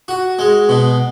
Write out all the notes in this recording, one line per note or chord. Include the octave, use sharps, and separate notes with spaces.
F#4
G#3
B2